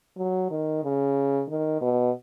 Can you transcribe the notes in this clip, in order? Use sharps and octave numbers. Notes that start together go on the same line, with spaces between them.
F#3
D#3
C#3
D#3
B2